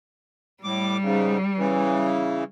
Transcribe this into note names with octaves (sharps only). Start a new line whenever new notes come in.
A2 G3 D6
G#2 C#3
C#3 E3